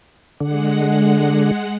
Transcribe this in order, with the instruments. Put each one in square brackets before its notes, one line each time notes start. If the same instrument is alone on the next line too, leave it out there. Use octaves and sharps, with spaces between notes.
[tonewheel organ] D3 [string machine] G#3 F#5